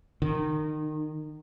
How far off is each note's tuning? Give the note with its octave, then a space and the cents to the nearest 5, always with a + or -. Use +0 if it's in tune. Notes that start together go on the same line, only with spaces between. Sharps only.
D#3 -25